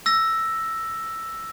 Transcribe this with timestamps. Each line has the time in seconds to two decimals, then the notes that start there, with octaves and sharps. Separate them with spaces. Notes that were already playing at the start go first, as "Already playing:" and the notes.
0.06 E6 A#6